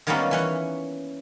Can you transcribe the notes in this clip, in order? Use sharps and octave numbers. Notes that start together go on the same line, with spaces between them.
D#3 F#3 G3 A#3 B3 C#4
E3 C#4 F#5